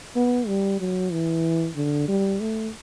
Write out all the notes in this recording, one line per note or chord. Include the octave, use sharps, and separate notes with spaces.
B3
G3
F#3
E3
D3
G3
A3